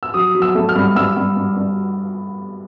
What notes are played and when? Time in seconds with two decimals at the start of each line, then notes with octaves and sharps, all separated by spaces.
0.03 E6
0.14 F#3 D#6
0.35 F#3
0.42 E6
0.55 A3
0.69 F6
0.76 G2
0.96 G2 E6
1.17 G2
1.36 G2
1.57 G2